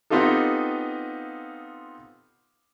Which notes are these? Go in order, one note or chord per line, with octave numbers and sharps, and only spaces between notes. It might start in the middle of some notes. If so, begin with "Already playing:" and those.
B3 C4 D#4 F4 G4 A4